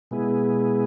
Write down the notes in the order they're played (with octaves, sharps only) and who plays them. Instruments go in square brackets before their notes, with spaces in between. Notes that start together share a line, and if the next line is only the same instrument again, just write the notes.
[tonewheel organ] B2 G#3 B3 E4 G#4